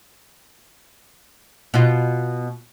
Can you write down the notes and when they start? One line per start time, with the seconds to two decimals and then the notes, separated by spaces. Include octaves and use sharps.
1.74 B2 F4